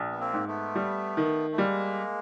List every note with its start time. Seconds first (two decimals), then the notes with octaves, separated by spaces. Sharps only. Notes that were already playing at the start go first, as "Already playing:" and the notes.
Already playing: A#1
0.11 B3
0.20 A#3 C4
0.34 G#2
0.47 A3 B3
0.75 G3
1.17 D#3
1.52 A3
1.58 G3 G#3 A#3